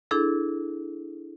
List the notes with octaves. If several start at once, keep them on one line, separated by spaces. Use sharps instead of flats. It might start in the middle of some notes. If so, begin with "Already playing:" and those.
D4 E4 G#4 A4